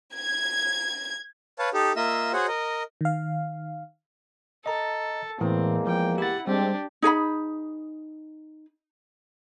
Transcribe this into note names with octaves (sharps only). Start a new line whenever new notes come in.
G#6
B4 C#5 F5 A5
D#4 G4 A4
A#3 F4 D#5 E5 E6
F#4 G#4 C5 C#5 F#5
A#4 D#5
D#3 F5
A4 D#5 A#5
E2 A2 E3 G#3 A#3 C4
F3 G5
E4 G4 F#5 A6
G3 G#3 C4 D4 G4
D#4 G#4 F5 B5